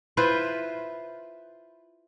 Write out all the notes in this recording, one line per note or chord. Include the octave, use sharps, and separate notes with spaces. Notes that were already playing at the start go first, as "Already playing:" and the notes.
E4 F4 B4 C5